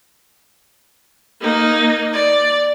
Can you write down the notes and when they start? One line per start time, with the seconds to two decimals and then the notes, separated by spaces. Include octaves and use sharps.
1.40 A#3 D#4
2.13 D5